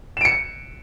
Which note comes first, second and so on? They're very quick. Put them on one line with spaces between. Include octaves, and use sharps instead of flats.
E7 D7 C#7